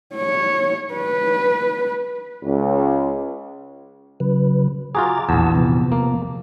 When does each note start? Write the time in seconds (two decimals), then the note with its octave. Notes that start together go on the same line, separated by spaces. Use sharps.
0.15 C#5
0.94 B4
2.43 C#2
4.20 C#3 F#3 B4
4.95 F4 F#4 G#4 A#5 D6 A6
5.29 A#1 E2 F#5 A5 E6
5.55 C3 F3 B3
5.92 A#3